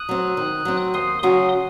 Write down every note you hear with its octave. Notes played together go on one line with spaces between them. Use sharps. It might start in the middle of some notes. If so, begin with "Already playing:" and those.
Already playing: D#6 F#6
F#3 C4
D#3
F#3 C4
D#2 C6 D#6
C#3 F#3 C#4 F#4 C6 D#6